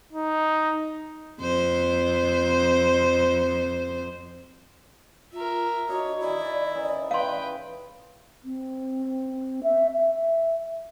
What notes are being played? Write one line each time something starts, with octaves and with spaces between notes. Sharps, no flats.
D#4
F2 C5
F4 A#4 E5
D4 D#4 F#4 C#5
D#3 E4 D5 G#5
C#3 E3 D#4
B4 F5 G5 C6
C4
E5
E5